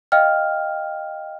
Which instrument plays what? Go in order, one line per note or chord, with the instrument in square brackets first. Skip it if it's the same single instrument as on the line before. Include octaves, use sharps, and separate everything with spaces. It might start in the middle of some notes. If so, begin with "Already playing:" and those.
[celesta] D#5 F5 G5 F6